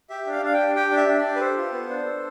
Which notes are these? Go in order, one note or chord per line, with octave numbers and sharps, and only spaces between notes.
G4 E5
D4
F5
D4 F5
G5
G4
G4 G5
D4
E5
D4
D5
G4
B4
A4 C5
F4
B3
D4
A4